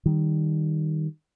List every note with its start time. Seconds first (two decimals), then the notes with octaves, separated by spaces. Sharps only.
0.06 D#3 G3